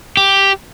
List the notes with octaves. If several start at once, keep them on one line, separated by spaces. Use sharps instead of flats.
G4